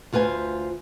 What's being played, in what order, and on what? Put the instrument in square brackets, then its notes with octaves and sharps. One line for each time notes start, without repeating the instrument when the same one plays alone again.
[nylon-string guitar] D2 F4 B4 C5 G#5